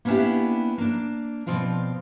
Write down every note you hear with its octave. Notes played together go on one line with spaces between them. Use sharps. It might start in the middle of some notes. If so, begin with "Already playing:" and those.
A#3 B3 C#4 D4 E4 G4
A#3 D4
B2 F3 C4 F4 D5